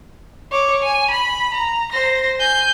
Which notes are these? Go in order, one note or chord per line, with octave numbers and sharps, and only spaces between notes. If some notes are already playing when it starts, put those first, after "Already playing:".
C#5 D6
G#5
B5
A#5
C5 A#6
G#5 G6